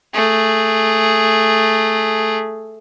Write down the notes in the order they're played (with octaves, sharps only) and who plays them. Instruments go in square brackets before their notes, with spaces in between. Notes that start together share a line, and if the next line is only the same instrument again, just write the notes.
[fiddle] A3 G#4